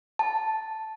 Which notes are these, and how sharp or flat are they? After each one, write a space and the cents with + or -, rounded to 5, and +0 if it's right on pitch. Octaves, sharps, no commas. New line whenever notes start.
A5 -5